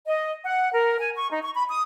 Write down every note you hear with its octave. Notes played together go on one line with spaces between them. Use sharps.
D#5
F#5
A#4
G#5
C#6
D#4
C#6
B5
D#6